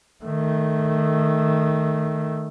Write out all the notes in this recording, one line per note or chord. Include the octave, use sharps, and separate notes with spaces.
D#3 A3